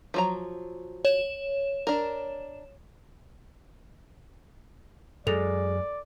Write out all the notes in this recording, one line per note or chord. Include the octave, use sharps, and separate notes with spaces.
F3 F#3 A#5
C#5 E7
D4 A#4
F#2 G#3 A4 D5 F7